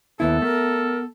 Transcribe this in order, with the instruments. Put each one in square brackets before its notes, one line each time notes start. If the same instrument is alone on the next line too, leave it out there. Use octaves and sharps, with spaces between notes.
[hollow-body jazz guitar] D#2 E4 [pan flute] B3 [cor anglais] A4 [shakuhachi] B4
[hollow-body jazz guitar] A3 [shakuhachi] A#4